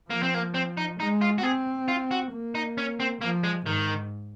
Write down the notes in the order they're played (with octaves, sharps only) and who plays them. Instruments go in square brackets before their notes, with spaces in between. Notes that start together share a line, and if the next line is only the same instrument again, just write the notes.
[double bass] F3 [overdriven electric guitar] A#3
[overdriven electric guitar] C4
A#3
C4
D#4
[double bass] G#3 [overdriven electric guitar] D#4
[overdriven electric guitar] F4
F#4
[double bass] C4 [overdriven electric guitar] G#4
[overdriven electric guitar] F4
F#4
[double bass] A#3
[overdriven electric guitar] D#4
C#4
C4
[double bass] F3 [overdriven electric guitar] A#3
[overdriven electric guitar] G#3
[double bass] G#2 [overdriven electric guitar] D#3